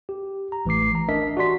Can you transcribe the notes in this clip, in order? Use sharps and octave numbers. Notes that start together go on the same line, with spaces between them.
G4
A#5
A1 E3 A3 D6 C7
A#5
D4 A#4 D#5 E5 A5 B6
F#4 G4 D5 C6 B6